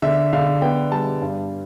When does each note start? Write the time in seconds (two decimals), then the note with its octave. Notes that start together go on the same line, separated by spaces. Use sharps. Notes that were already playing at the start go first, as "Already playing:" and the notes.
0.02 D3 E5
0.33 D3 F5
0.62 B3 G5
0.92 G3 A5
1.22 G2